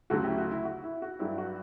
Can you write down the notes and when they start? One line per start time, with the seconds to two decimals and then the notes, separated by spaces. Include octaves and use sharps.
0.10 D2 C#3 F#3 F#4 A4
0.24 E4 G4
0.38 F#4
0.51 E4
0.65 F#4
0.84 E4
1.02 F#4
1.19 G2 F#3 E4
1.38 F#4